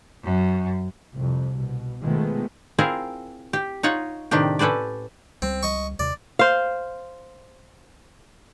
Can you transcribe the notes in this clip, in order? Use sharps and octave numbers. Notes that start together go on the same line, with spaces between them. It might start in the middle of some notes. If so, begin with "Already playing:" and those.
F#2
C2 F2
B2
D#3 F3 G#3 A3 B3
C4 E4 F4 G#4 A#4
G4
D#4 F4 C#5 F#5
A2 C3 D#3 D4 G4
C#4 A4 B4 C5 D5
C#2 G3 C4
D#5 C#6
D#2 C3 D5
C5 F5